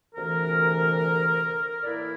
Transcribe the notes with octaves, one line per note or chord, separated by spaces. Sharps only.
D2 C3 E3 A#4
A2 E3 A#3 E4 D5